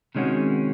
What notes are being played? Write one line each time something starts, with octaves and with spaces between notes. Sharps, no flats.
C3 D#3 G#3 C#4 F#4